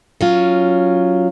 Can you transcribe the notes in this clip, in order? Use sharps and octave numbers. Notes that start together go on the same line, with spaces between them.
F#3 C#4 F4